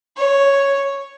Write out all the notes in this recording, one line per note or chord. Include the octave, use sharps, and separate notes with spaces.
C#5